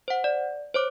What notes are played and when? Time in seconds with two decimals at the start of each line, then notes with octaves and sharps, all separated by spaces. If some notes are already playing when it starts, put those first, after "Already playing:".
0.08 C5 F#5
0.24 D5
0.74 C5 C#5 D6